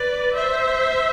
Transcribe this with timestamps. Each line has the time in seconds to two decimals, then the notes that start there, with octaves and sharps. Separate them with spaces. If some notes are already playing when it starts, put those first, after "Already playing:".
Already playing: B4 D5
0.34 C5 E5